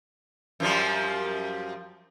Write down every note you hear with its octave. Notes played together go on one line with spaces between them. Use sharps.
F#2 F3 G3